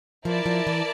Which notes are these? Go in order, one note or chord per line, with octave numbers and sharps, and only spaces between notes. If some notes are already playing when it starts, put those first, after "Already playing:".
F3 E4 A#4 D5 A5
F3
E3